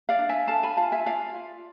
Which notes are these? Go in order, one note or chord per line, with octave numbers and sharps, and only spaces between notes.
D5 F5
D4
E5 G#5
A4 F5 A5
G#5 B5
F4 F5 A5
E5 G#5
F4 D5 F5
F4